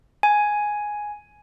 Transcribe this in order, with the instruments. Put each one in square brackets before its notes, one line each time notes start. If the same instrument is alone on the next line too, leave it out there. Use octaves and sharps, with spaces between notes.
[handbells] G#5